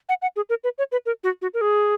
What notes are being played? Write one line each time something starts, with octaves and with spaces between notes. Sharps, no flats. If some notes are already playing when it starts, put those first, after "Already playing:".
F#5
F#5
G#4
A#4
B4
C#5
B4
A#4
F#4
F#4
A#4
G#4